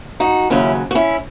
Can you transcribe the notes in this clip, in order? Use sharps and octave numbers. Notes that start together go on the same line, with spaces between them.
D#4 F#4
D#2 C#3 F#3 C#4 E4
F#4
C#4 E4